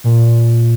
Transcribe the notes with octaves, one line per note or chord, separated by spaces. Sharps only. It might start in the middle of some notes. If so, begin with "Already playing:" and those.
A#2